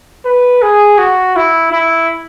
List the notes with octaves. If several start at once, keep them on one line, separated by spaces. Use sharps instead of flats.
B4
G#4
F#4
E4
E4